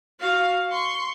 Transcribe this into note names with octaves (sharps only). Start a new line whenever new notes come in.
F#4 F5
C6 C#6